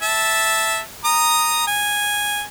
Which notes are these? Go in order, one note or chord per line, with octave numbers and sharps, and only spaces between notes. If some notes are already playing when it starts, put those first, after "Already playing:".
E5 A5
A#5 D#6
G#5